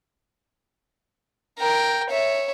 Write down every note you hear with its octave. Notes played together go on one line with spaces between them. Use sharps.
A#4 G5
C#5 E5